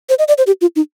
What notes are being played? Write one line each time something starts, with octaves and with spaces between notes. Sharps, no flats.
C5
D#5
D5
C5
G4
F4
D#4